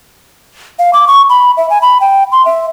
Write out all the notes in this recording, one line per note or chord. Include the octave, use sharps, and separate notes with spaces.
F5
D6
C#6
B5
E5
G#5
B5
G5
C6
E5